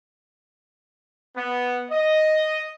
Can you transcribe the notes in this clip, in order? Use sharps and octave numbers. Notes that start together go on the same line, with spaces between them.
B3
D#5